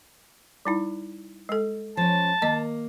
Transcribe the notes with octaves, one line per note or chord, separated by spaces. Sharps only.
G3 D#4 E4
G#3 A4
F3 C#4 A5
D#3 A#3 D#5